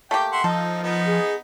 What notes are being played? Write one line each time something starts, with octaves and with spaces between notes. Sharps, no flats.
A3 A#3 G4 G5
E5 F#5 C6
F3 D#4 A4
B3 D#4
G#4